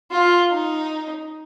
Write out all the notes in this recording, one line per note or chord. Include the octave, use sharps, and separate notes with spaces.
F4
D#4